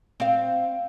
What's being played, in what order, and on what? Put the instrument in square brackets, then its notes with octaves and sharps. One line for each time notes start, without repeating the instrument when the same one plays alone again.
[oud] C4 F5